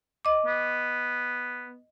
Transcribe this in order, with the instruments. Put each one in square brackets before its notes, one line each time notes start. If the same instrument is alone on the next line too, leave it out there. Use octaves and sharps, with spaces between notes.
[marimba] D#5 D6
[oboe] B3